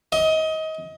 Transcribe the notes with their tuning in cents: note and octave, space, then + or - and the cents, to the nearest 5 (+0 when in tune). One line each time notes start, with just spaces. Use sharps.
D#5 +25